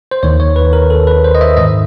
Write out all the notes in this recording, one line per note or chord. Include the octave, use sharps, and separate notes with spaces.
C5
D#2 D#3 C#5
C#5
B4
A#4
A4
B4
C5
D#5
E5
G#2 D#3 D#5